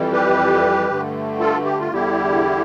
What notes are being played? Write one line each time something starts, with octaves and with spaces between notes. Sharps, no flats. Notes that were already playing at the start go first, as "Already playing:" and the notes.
Already playing: F2 E3 G3
G4 B4
G2 D3 A3
F4 A4
G4
F4
E2 D3 G3 E4 G4